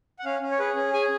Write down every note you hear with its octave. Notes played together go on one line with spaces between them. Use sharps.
F#5
C#4 F5
C#4
C#5
G#4 B4
C#4
G#4 G#5